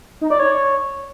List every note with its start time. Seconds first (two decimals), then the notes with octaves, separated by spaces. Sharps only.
0.21 D#4
0.30 D5
0.39 C#5